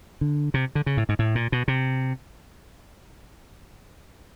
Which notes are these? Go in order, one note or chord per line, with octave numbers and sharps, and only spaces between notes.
D3
C3
D3
C#3
A2
G#2
A2
A#2
B2
C3